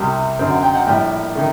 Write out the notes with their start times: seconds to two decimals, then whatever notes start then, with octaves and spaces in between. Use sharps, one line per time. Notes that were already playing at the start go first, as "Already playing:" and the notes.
Already playing: C2 C3 G3
0.39 F#2 D3 F#3 C4
0.51 F#5
0.63 G5
0.75 F#5
0.87 A#1 A2 G3 G5
1.35 D#3 A3